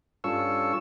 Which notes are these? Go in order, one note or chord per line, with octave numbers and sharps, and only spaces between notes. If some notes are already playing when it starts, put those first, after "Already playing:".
G2 C#4 F4 A4 C#6 E6